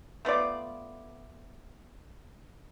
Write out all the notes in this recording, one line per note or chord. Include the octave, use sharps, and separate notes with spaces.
A3 B3 F4 D5